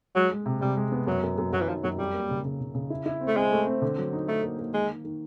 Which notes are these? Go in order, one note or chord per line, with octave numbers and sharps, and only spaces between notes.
F#3 G#3
G#3
C3
C3 G3
G#3
B3
F#2 F#3
F#2
F#2
F#2 F#3
E3
D#3 F3
F#2 F#3
F2 G3
A#3
C#3
C#3
C#3
C#3
E4
E4
C4
A3
G#3 C4
A3
C4
D3
F#3
D#4
A3 D#4
A#3
A#3
D#3 G#3
D#3
D#3